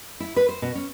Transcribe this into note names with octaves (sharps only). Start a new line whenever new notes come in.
E4
B4
C5
B2
C#4